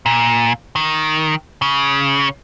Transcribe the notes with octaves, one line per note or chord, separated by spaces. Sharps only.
A#2
D#3
C#3